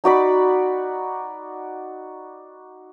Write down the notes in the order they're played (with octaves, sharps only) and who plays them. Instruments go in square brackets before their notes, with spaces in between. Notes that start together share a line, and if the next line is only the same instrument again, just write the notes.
[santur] D#4 F#4 D5 B5